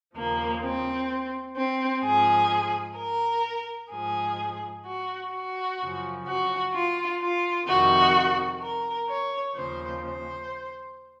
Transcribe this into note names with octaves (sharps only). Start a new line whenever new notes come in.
D#2 C#3 F3 A#3
C4
C4
G#2 F3 G#4
A#4
G#2 F3 G#4
F#4
F#4
F#2 C#3 F3
F#4
F4
F4
F2 C3 D#3 F#4
A#4
C#5
D#2 C#3 F3 C5
C5